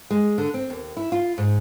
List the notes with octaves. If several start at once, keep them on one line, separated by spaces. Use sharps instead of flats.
G#3
D3
C4
D#2
E4
F4
G#2